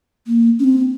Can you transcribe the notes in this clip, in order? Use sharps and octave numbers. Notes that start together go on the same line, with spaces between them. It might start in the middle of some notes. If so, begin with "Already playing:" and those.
A#3
C#4
C4